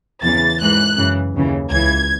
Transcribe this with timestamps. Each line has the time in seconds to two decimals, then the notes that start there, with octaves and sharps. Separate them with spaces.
0.23 E2 C#3 E3 A6
0.61 G#2 E3 F#6
0.97 F#2 C#3 E3
1.34 D#2 C#3 E3
1.71 C#2 C#3 E3 G#6